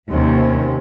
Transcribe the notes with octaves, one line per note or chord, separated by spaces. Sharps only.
D#2 C3 C#4